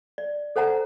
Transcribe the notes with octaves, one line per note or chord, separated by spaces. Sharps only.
D5
A4 C5 F#5 G#5 A#5